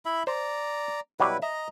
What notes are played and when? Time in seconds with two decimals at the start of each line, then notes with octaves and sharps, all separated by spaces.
0.05 E4 E5 B5
0.27 C5 D5 A#5
1.20 B2 F#3 G3 E4 B4
1.42 D#5 E5 A#5